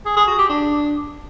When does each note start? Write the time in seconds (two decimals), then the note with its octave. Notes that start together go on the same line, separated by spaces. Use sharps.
0.05 G#4
0.16 G#4
0.27 F#4
0.38 G4
0.49 D4